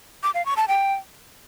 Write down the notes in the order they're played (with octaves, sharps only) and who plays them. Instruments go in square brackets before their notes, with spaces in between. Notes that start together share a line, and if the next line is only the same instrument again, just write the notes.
[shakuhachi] D6
F5
C#6
A5
G5